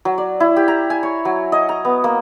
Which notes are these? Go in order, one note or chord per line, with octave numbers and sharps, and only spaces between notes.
F#3
D5
E4
G4
A#5
G#5
C#5
F#3
D#5
A#5
B3
A#3